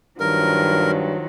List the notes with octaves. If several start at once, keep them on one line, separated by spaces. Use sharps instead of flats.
G2 D#3 F3 F#3 A#4